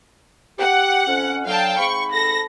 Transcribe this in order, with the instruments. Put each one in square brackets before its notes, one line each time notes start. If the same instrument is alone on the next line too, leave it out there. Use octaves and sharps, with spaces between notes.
[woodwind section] G4 G5 [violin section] F#5
[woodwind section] F2 C#4
[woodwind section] D3 F#3 [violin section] F5 G5 A5
[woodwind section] G#2 C4 B5 [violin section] C#6
[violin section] A4 A#6